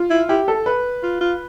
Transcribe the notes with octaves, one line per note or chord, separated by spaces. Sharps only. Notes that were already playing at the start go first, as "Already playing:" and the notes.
Already playing: F4
E4
E4 G4
A4
B4
F4
F4